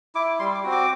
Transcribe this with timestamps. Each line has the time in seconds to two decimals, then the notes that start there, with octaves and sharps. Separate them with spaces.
0.15 E4 D6
0.39 G3 C6
0.55 D6
0.64 C4 F#4
0.72 D6